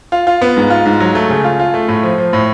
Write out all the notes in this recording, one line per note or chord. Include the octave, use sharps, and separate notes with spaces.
F4
F4
B3
G#2
F4
G#2
F#3
A3
C#3
F4
F4
A3
A2
F3
F3
A2